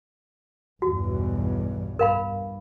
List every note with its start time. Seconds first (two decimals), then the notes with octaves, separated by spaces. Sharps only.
0.82 B1 E2 G2 F#4
1.99 G2 A#4 F5 B5